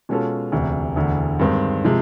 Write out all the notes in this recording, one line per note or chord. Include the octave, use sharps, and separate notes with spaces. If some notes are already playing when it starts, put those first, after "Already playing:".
B2 G#3 C#4 F4 A4
E1 D2 C3
E1 D2 D3
G2 D#3 G#3 C4
C3 F3 G#3